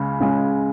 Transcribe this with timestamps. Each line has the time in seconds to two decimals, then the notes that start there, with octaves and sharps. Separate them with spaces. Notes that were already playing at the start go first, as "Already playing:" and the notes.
Already playing: C#2 C#3 G#3 C#4
0.20 C#2 C#3 G#3 C#4